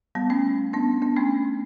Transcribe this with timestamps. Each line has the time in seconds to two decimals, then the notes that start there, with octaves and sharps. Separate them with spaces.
0.15 G3 B3
0.30 A3 C#4
0.73 B3 D4
1.02 B3 D4
1.17 A3 C#4